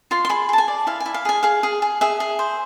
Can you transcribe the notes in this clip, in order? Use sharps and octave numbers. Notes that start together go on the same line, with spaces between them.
F4 C6
C6
G#4 B5
G#4 A5
G#5
D5
E4 F5
G#5
E4
F5
G#4 G#5
G#4 F5
G#4
G#4
G#4 E5
G#4
C5